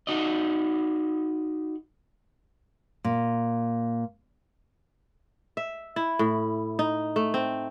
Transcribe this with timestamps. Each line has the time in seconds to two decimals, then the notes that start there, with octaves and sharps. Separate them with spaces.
0.07 D#4 F#4 D5 D#5
3.04 A#2
5.57 E5
5.96 E4
6.19 A2
6.79 D#4
7.16 A3
7.34 C4